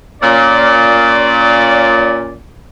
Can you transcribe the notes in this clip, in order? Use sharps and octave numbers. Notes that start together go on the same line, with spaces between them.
A#2 C#4 D5